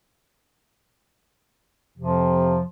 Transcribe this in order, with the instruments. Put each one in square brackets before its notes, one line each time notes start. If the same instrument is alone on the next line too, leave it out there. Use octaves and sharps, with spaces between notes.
[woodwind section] F2 C3 F3